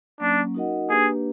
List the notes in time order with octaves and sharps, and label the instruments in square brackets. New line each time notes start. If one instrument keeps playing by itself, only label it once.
[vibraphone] F#3 A#3 C#4 [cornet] D4
[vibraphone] D#4 F#4 A#4 D#5 F#5
[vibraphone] A#3 D4 G4 B4 [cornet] G#4